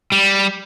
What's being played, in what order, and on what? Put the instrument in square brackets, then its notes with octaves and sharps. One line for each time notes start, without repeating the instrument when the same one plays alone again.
[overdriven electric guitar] G3